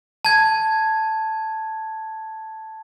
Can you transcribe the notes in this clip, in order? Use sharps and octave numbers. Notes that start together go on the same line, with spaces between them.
A5 G#6